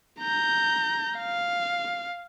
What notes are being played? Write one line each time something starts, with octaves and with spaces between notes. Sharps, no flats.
A#5 G6
F5